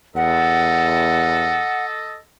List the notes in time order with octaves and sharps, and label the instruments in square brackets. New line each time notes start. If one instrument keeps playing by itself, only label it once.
[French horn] E2 [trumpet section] A4 D#5 [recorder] F#5